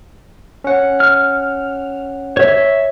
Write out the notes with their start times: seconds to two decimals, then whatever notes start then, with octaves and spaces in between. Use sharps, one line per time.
0.64 C#4 F#5
1.00 F6
2.37 C#5 E5